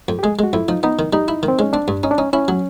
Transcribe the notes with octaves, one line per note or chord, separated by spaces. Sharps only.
F2
G4
G#3 G#4
G#3 F#4
F2 E4
F3 D#4
B3 D#4
D#3
G3 D#4
E4
D#3
C4
G#3 C#4
C4 D4
G2
C#4 D#4
D4
C#4 D#4
C#4 E4
F#3